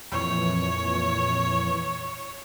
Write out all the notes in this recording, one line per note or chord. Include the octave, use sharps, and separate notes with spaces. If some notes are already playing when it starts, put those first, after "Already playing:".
F2 A#2 E3 C#5